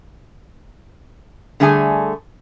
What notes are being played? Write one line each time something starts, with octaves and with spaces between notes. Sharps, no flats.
D3 G3 A3 G#4 G#5